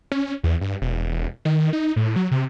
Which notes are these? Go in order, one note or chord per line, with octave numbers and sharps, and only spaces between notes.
C#4
E2
G2
E1
D#3
D#4
A2
F#3
C3